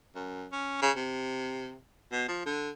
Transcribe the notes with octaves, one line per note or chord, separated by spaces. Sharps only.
F#2
C#4
C#3
C3
B2
F3
D3